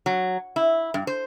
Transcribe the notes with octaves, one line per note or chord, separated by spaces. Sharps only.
F#3
E4
G2
C5